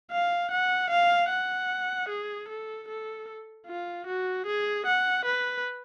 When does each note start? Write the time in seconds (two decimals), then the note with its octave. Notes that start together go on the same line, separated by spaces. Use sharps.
0.11 F5
0.51 F#5
0.90 F5
1.30 F#5
2.09 G#4
2.48 A4
2.88 A4
3.67 F4
4.07 F#4
4.46 G#4
4.86 F#5
5.25 B4